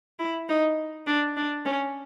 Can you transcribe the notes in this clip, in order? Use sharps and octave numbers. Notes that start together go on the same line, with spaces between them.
E4
D#4
D4
D4
C#4